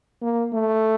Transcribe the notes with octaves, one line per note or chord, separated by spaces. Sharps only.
A#3
A3